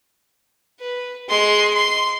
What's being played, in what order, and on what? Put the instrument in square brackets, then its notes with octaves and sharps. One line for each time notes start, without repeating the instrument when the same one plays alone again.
[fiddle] B4
G#3 C6
C6